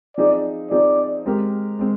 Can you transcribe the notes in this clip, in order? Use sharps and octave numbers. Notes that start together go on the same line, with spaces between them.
F3 C4 D#4 G#4 D5
F3 C4 D#4 G#4 D5
G#3 C4 G4 A#4
G#3 C4